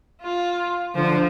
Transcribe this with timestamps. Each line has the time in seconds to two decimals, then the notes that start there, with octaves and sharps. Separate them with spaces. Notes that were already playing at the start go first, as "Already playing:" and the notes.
0.22 F4
0.95 D3 F3